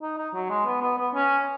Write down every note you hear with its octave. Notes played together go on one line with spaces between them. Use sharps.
D#4
D#4
F#3
G#3
B3
B3
B3
C#4